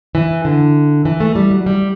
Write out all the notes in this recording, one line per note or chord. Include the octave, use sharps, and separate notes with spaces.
E3
D3
E3
A3
G3
F#3
G3